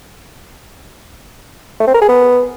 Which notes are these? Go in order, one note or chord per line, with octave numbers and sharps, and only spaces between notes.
A3
C4
A#4
G#4
B3